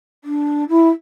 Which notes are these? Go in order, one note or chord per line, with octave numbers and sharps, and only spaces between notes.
D4
E4